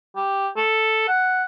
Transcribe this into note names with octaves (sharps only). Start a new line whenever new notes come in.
G4
A4
F#5